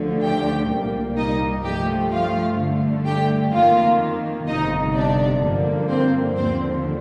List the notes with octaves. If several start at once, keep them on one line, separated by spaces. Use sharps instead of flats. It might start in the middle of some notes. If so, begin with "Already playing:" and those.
Already playing: D2 D3 F3 A3
G4 G5
C2 A#2 G3 A#3
D#4 D#5
G2 F3 A3 G4 G5
F4 F5
G2 D3 A3
G4 G5
F2 D#3 A#3 F4 F5
G1 F2 C3 D#4 D#5
D4 D5
G2 D3 F3 A#3
C4 C5
D#2 D3 F3 C4 C5